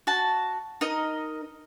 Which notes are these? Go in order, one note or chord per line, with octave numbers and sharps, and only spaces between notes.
F#4 A5
D#4 A#4 D#5